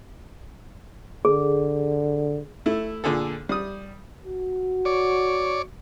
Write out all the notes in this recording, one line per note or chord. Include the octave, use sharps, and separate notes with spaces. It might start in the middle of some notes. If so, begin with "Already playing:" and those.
D3 G#4
A3 E4
A#2 D3 G#4 A4
G3 D#6
F#4
C#5 D5